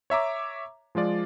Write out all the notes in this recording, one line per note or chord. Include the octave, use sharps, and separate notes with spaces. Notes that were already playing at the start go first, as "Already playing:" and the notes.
C#5 E5 A#5 D6
F3 G#3 F4 D5